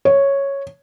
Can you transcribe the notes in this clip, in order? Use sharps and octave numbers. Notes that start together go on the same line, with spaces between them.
C#5